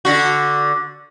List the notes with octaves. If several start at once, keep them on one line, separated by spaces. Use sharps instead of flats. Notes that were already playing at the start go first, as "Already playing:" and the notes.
D3 F#4